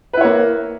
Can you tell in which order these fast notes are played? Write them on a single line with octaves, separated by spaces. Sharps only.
B4 E4 C#5 A#3